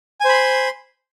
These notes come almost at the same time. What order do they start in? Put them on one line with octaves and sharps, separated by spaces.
G#5 C5 B5 C6